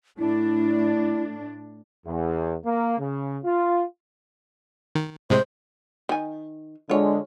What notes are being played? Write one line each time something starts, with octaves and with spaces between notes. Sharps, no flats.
A2 D4 E4
E2
A#3
C#3
F4
D#3
A2 C3 G#3 C5
D#3 G#5
D3 G#3 F4 C#5